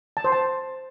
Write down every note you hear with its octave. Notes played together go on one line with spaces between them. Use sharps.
A5
C5
A5